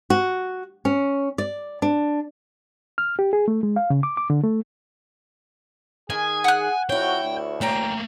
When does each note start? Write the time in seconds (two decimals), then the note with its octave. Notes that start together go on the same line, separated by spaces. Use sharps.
0.10 F#4
0.85 C#4
1.38 D5
1.82 D4
2.98 F6
3.19 G4
3.33 G#4
3.48 A3
3.63 G#3
3.76 F5
3.90 C#3
4.03 D6
4.17 D6
4.30 D3
4.44 A3
6.10 D#3 G#4 G#5
6.44 F#5 F#6
6.89 F2 E4 F#4 C#5 G5
7.21 D2
7.61 A3 A#3 C#4 G5 A#5